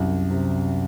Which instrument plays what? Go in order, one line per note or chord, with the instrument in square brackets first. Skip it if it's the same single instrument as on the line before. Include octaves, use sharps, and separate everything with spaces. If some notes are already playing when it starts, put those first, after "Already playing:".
Already playing: [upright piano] C2 [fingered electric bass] F#2
[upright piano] C3